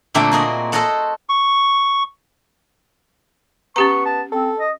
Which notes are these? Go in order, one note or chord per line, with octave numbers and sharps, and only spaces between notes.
A#2 D3 A3 C4 G5 A5
A#3 F#4 G#4 D#5
A4 C5 C#5 D#5 F#5 A5
C#6
B3 C#4 G4 A#5 C#6
A5
C4 A4
D#5